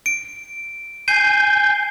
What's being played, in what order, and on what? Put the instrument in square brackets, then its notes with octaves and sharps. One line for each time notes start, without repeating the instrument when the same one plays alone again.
[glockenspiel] D7
[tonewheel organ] G#5 G6 [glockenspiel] C7